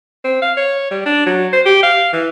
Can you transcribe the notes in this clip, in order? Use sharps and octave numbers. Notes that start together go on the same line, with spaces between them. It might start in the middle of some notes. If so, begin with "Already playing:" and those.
C4
F5
C#5
G3
D4
F#3
C5
G4
F5
E3